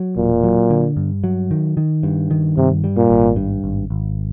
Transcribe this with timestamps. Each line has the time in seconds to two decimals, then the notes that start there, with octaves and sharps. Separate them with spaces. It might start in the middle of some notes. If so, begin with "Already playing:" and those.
Already playing: F#3
0.17 E1 A#2
0.44 F#3
0.70 D3
0.97 G2
1.24 F#3
1.51 D#3
1.77 D#3
2.03 G2
2.31 D#3
2.57 G2 C3
2.84 G3
2.97 A#2
3.10 G#1
3.36 G2
3.64 G#1
3.90 G#1